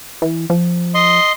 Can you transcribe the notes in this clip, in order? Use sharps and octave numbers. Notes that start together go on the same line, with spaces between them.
E3
F3
D#5 C6